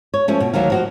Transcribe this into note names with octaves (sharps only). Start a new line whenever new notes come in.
C#5
F3 A3 C#4
B2
D2 D#3 F#3 D#4 F5
F3 F#4 D#5